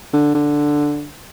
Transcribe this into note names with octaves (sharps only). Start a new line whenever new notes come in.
D3
D3